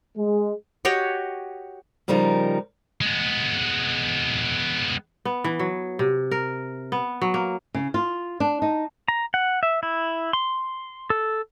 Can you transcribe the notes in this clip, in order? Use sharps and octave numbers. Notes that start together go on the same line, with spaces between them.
G#3
F#4 G4 C#5 D#5
C#3 F3 G3 D#4 A#4
G#3 B3
B3
E3
F#3
C3
A#4
B3
F#3
A#3
C#3
F4
D4
D#4
A#5
F#5
E5
E4
C6
A4